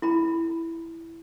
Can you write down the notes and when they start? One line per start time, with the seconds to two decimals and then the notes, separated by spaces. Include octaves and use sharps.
0.02 E4 A#5 B5